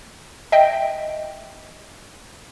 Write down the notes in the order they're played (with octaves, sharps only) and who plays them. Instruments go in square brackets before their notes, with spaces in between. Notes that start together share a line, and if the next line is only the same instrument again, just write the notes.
[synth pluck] D#5 E5 G5